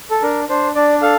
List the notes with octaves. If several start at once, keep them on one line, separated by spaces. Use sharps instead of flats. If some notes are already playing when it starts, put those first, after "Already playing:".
A4
D4 A#4
D4 C5
D4 D5
A4 F5